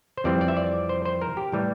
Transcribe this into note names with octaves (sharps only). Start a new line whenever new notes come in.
C5
F2 E3 G3 C4 D5
D5
E5
D5
C5
C5
A#4
G4
A2 E3 G3